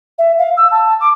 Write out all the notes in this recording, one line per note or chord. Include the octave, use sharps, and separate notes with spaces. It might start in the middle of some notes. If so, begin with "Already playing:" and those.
E5
F5
E6
A5
D6